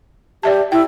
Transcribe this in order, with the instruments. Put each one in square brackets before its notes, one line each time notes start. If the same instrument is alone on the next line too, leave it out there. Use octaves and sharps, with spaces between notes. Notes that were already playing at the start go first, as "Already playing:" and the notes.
[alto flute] G4 [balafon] D5 E5 A5
[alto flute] E4 [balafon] G5